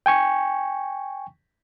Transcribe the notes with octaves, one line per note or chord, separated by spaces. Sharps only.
G5 G#5 C#6